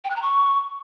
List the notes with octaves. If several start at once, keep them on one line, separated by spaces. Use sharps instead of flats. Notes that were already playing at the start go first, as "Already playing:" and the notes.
G5
F#6
A#5
C#6